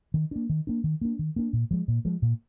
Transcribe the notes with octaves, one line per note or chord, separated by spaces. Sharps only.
D#3
A#3 D4
D#3
A#3 D4
D#3
A#3 D4
D#3
A#3 D4
A#2
F3 G#3
A#2
F3 G#3
A#2